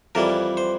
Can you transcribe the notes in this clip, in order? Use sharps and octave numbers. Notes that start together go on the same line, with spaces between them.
F2 E3 G3 A#4
C5